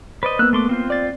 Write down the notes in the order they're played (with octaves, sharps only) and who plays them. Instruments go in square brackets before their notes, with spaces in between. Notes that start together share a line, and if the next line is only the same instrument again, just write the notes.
[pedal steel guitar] B4 D5 D#5 [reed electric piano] C5
[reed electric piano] A#3 B3 [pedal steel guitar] E6 F#6
[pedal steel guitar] A3 C6 D6
C4 F4 C5
[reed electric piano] D5 A6